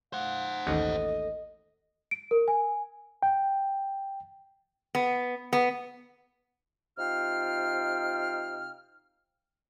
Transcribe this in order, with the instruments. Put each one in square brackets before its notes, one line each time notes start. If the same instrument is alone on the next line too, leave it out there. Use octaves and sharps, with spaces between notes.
[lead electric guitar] C5 F#5 [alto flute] F5
[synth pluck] A1 D#2 [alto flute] A4 [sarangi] D#5
[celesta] D7
A#4
G#5
[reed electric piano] G5
[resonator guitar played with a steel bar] B3
B3
[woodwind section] C3 D#4 F4 F5 G5 F6